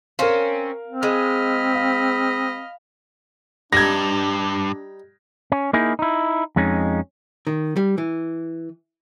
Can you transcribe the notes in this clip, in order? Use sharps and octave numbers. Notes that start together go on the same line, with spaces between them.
C4 C#4 A#4 F5
C4
G#3 D#5 B5 F6
F5
G2 G3 D4 D#4 G#6 A#6
C#4
A#3 D#4 E4 G#4
D#4 E4
F2 G#3 C#4 D#4
D#3
G3
E3